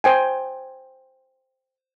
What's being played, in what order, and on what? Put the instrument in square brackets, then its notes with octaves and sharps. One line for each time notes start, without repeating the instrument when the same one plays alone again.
[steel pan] C5 G5 G#5